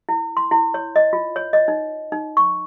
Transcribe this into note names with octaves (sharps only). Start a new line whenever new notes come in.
E4
C6
E4
C#5
D#5
F4
C#5
D#5
D#4
D#4
C#6